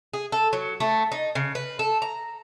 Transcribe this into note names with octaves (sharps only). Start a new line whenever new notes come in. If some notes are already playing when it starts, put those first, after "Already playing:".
G#4
A4
F#3
A3
D#4
C#3
B4
A4
A#5